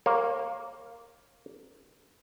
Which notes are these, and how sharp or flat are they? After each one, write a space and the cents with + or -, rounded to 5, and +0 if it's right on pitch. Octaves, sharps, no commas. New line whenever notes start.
A#3 +0 C#5 -40